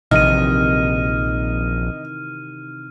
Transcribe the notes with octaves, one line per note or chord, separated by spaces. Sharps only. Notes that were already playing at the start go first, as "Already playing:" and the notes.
A#1 C3 D#3 E3 D#4 F6 D#7